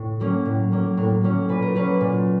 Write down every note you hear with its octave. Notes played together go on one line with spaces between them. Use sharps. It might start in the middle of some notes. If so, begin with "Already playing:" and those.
Already playing: A2
F#3 A#3 C#4
A2
F#3 A#3 C#4
A2 A#4
F#3 A#3 C#4
A#2 B4
A#4
F#3 A#3 C#4 B4
A#2